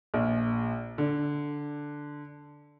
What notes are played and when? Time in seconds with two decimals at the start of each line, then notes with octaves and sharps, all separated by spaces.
0.14 A#1
0.98 D3